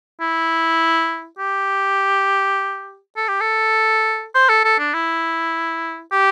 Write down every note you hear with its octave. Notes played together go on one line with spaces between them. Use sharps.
E4
G4
A4
G4
A4
C5
A4
A4
D4
E4
G4